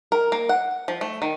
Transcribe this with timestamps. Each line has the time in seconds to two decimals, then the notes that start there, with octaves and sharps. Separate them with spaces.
0.12 A#4
0.32 A#3
0.49 F#5
0.88 F3
1.01 A3
1.22 D#3